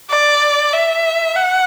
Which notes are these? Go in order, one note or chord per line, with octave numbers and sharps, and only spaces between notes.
D5
E5
F#5